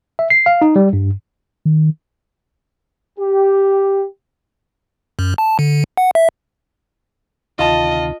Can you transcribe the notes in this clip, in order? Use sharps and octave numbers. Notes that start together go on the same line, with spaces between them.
E5
C7
F5
D#4
G3
G2
D#3
G4
F#2
A5
D3
F#5
E5
D2 C3 D#3 F4 D#5 A5